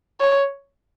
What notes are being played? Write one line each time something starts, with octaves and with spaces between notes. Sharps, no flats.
C#5